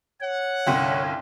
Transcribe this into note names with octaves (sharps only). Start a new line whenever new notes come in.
C#5 F#5
G1 C2 C#4 F5 G5 C6